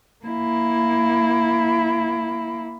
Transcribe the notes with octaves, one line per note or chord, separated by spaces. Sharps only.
A#3 E4